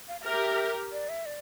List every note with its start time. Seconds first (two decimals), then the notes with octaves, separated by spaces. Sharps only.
0.08 F5
0.21 F5
0.25 G4 A#4 E5
0.92 D5
1.09 E5
1.26 D5